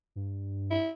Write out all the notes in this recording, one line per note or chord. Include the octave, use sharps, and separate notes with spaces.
G2
E4